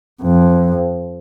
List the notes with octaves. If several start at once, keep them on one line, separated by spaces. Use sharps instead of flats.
F2